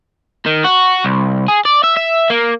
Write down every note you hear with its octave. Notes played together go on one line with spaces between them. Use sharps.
D#3
F#4
C2
G#4
D5
E5
E5
A#3